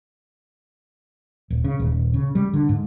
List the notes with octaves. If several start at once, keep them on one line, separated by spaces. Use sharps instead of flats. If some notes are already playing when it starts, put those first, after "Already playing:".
D#1
C#3
D#1
C#3
G3
D3
G#2